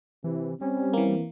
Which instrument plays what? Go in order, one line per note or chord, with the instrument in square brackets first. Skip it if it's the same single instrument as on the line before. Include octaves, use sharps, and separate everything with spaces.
[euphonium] C3 [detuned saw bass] E3
[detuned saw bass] G3 [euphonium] C4 [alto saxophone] C#4
[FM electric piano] E3 A#3